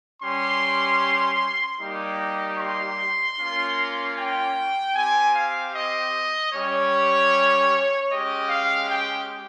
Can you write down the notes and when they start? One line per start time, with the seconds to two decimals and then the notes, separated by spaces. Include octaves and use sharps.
0.22 G3 C#4 G4 C6
1.80 G3 A#3 D#4 G4
2.59 C6
3.38 A#3 C#4 F4
4.17 G5
4.95 C4 G4 G#5
5.35 F5
5.74 D#5
6.53 G3 C#4 G4 C#5
8.10 G#3 C#4 G4 D#5
8.50 F5
8.89 G5